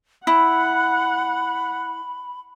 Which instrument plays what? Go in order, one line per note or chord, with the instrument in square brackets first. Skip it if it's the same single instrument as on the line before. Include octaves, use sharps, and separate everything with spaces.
[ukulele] E4 [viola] F#5 [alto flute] B5